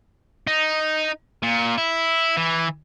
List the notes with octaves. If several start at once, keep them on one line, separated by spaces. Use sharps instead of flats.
D#4
A#2
E4
E3